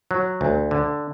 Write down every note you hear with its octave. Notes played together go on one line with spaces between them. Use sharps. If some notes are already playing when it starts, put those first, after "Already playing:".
F#3
D2
D3